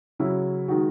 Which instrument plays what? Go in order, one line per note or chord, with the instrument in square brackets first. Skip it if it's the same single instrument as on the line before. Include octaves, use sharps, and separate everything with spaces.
[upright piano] C#3 F#3 C#4 E4
D#3 G#3 D#4 F#4